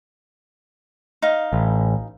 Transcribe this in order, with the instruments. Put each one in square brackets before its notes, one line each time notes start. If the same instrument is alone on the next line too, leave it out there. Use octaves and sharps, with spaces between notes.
[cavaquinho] D#4 F5
[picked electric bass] A1